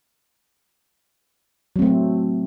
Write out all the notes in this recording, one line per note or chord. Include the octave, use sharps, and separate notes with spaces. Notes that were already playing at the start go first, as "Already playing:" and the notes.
F#3 A3 C4